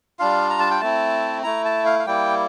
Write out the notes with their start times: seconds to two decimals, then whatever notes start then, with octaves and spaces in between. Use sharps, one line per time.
0.19 G3 D4 F4 F5
0.50 A#5
0.60 A5
0.70 G5
0.80 A3 C4 E4 A5
1.43 A3 E4 A#5
1.65 A5
1.86 F5
1.99 F5
2.06 G3 A#3 E4 G5